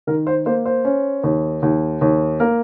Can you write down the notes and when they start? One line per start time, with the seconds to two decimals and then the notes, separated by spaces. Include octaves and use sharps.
0.07 D#3 A#4
0.27 C5
0.46 A#3 C5
0.66 C5
0.85 C#4
1.23 D#2
1.62 D#2
2.01 D#2
2.40 A#3 A#4